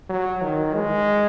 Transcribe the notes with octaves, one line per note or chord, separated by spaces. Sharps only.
F#3
D#3
G#3